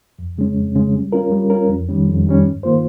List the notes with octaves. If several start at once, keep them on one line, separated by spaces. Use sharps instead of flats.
F2
C#3 G#3 C#4
F2
C#3 G#3 C#4
G3
C#4 F4 A#4
G3
C#4 F4 A#4
F2
D#3 G3 C#4
F2
D#3 G3 C#4
G2
D#3 A#3 F4 C5